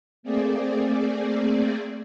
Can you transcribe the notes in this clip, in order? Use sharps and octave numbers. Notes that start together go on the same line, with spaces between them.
A3 A#3 C4 G#4 D5